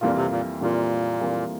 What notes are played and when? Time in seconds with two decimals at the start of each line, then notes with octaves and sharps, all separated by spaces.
0.01 F2 A#2 E3 G3 A#3 F4
0.16 C3
0.31 A#2
0.61 F2 A#2 E3 G3 A#3 F4
1.20 F2 E3 G3 A#3 F4